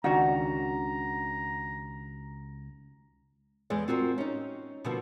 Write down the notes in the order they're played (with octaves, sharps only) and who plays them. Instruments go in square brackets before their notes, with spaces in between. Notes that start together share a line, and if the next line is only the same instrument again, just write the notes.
[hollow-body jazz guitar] C#2 D#3 F#4 [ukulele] D4 F#5 [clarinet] A#5
[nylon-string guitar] E2 G#3 D5
C4 F4 F#4 A#4
C#4 D#4
B2 D3 F3 A#3 F#4